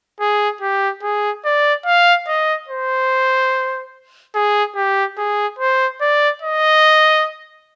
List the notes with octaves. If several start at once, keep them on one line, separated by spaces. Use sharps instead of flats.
G#4
G4
G#4
D5
F5
D#5
C5
G#4
G4
G#4
C5
D5
D#5